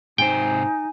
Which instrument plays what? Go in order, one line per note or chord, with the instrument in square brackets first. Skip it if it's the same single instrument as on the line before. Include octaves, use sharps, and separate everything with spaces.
[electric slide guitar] G#2 C3 C5 [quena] D#4 [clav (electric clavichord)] G5 [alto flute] G#5